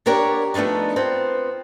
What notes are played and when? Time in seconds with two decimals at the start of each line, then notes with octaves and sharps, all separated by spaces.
0.06 D4 G4 A#4 C#5 D5 F#5
0.54 F3 A3 B3 D4 D#4
0.96 B3 C4 F4 F#5